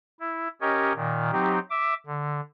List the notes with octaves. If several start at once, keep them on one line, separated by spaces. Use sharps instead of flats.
E4
C#4 G4 A#4 C#5 D#5
A#2 D#3
F#3 C4 D#4 G4
E5 D6
D3